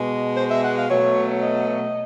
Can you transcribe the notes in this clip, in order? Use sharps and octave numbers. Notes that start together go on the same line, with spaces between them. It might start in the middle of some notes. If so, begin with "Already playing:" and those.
Already playing: B2 G#3
C5
E5
F#5
F5
B2 F#3 A3 C#5
D#5